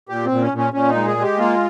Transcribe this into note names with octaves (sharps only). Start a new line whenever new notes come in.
A#2 G4
C4
A#2
C#4
A#2
C#4
A#2 C#4
D#4
G#3
G#4
G#3
G4
A#3 F4